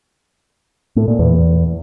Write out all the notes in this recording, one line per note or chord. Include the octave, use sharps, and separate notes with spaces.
A2
A#2
E2